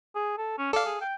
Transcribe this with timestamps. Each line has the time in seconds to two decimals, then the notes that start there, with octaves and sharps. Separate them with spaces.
0.16 G#4
0.38 A4
0.58 C#4
0.73 A4 D5 F5
0.86 G#4
1.01 G5